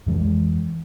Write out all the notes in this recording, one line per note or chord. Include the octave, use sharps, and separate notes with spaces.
F2 E3 G#3